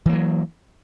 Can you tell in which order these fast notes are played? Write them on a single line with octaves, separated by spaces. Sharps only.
E3 A#3 F#3